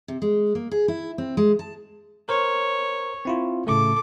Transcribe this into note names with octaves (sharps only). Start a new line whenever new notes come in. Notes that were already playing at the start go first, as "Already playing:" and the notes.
C3
G#3
A#3
G#4
E4
C4
G#3
A5
A#4 C5 C#5
C4 E4 F4
A2 C#3 A3 A4 D6